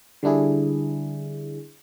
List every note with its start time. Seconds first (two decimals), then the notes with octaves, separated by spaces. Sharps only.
0.23 D3 G3 D4 E4 G#4